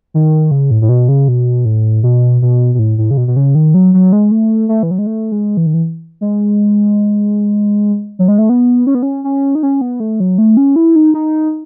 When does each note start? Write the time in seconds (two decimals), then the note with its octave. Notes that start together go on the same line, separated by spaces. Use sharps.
0.14 D#3
0.51 C#3
0.71 A2
0.82 A2
0.89 B2
1.09 C#3
1.28 B2
1.65 A2
2.03 B2
2.42 B2
2.75 B2
2.79 A2
2.98 A2
3.11 C#3
3.17 B2
3.28 B2
3.36 C#3
3.55 D#3
3.74 F#3
3.94 F#3
4.12 G#3
4.31 A3
4.69 A3
4.83 E3
4.91 F#3
4.99 G#3
5.07 A3
5.32 G#3
5.57 E3
5.66 D#3
5.74 E3
6.21 G#3
8.19 F#3
8.28 G#3
8.38 A3
8.49 B3
8.87 C#4
8.95 B3
9.03 C#4
9.24 C#4
9.55 D#4
9.63 C#4
9.81 B3
10.00 A3
10.20 F#3
10.38 A3
10.57 C#4
10.76 E4
10.96 D#4
11.14 D#4